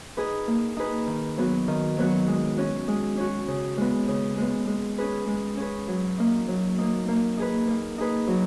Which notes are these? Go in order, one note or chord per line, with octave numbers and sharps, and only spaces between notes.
D#4 G#4 B4
A#3
D#4 G#4 B4
D#3
F#3 B3 F#4
D#3
F#3 B3 F#4
G#3
C#4 F#4
G#3
C#4 F#4
C#3
G#3 B3
C#3
G#3 B3
G#3
C#4 G#4 B4
G#3
C#4 G#4 B4
F#3
A#3 D#4
F#3
A#3 D#4
A#3
D#4 G#4 B4
A#3
D#4 G#4 B4
F#3